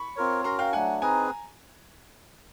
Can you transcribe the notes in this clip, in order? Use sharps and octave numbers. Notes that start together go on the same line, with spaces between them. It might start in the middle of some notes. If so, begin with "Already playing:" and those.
Already playing: B5 C#6
C4 F4 A#4 C#5
C#4 F#4 A#4 A#5 C6
F5 G5
F#3 A3 D4 F#5 G#5
C4 D#4 G#4 B4 G#5 A#5